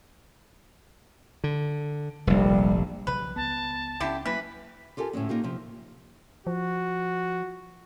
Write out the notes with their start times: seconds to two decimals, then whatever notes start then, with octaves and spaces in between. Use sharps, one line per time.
1.44 D3
2.27 F1 A#1 G3
3.07 B1 C#3 F3 B4
3.36 C#2 B3 A5
4.00 C#2 D3 C#4 E4 G4
4.26 E3 F#3 A#3 B4 B6
4.97 F4 G4 A4 A#4 G#5
5.13 D2 A2 D3 G#3 C#4
5.29 A#3 D#4 F4 G4
5.44 C3 F3
6.47 F3 F#4